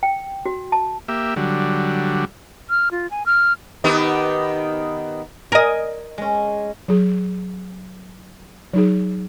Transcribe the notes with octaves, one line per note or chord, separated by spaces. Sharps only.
G5
F#4
A5
A#3 G4 E5
D3 F#3 G3
F6
F4
G#5
F6
D#3 B3 G4
A#4 D#5 G#5
G#3 C#4
F#3 G#4
F#3 D#4 G#4